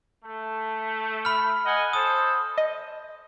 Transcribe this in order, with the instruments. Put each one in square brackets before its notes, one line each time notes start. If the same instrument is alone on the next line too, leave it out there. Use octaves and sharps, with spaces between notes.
[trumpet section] A3
[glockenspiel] B5 F6
[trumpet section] D#5 F#5 G#5
[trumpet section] A4 C5 [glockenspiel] D#6
[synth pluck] D#5